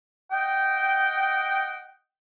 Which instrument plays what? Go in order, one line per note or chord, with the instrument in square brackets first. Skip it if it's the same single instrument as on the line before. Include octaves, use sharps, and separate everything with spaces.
[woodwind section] D#5 F#5 G5